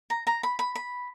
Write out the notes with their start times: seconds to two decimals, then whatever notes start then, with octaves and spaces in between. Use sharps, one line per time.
0.10 A#5
0.27 A#5
0.43 B5
0.59 B5
0.75 B5